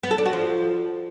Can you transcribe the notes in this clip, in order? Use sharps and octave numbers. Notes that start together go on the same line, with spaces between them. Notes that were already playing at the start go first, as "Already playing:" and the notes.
B3
A4
D4
F#4
F3